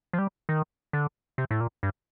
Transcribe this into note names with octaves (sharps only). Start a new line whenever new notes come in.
F3
G3
D#3
D3
C3
A2
A#2
G2